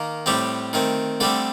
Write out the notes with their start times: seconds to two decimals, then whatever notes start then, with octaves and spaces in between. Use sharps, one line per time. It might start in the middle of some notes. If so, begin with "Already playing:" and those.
Already playing: D#3 A#3
0.26 A2 G3 A3 C4 G4
0.73 D#3 A3 C4
1.20 D3 G3 A3 C4 A4